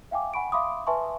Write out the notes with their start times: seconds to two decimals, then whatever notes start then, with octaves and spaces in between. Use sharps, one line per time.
0.11 E5 F5 G5 G#5 D6
0.34 F#5 G#5 B5 C#6 D7
0.52 E5 F5 B5 C6 D6 D#6
0.87 B4 E5 G#5 A5 C6 C#6